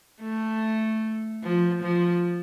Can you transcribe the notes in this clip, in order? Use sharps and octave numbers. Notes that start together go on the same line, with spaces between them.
A3
F3
F3